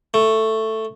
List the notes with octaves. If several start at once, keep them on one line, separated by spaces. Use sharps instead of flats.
A3